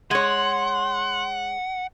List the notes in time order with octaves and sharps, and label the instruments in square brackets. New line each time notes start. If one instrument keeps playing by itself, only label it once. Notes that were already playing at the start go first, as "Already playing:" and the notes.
[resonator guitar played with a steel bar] G#3 C#5 [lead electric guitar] F#5 [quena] C6